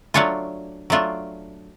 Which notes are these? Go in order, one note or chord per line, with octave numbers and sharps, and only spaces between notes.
F#3 A3 D4 F4 C#5
F#3 A3 D4 F4